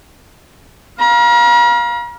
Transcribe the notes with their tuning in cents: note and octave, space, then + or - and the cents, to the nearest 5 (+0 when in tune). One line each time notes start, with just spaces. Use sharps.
F5 +5 A#5 +45